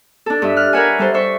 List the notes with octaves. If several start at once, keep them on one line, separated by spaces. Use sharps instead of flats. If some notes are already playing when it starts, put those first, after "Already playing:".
D4 A4
G2 E5
F6 F#6
A#4 B4 C#5 E5 F#5 G#5
G3 A4 C5
C5 E5 C#6